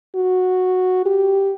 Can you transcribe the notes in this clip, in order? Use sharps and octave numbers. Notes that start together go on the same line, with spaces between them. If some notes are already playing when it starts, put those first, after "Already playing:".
F#4
G4